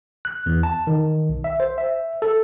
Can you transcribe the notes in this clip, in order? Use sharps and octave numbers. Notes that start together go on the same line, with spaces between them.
F#6
E2
A5
D#3
B1
E5
C5
E5
A4